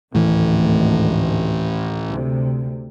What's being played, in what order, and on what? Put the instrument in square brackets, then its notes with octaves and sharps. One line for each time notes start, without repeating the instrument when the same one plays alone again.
[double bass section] G#1 D2 [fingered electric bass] A2 E3
[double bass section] D2 C3